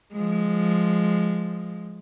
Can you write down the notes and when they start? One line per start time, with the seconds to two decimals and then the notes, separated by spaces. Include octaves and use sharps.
0.13 F3 G#3